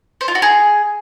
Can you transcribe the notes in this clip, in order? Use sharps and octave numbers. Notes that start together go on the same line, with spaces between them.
C5
F4
F#4
G#4